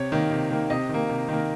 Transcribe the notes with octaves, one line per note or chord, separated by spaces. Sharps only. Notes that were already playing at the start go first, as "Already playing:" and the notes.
Already playing: C3 C#5
D#3 A#3
C3
D#3 A#3
C3 D#5
D#3 A#3
C3
D#3 A#3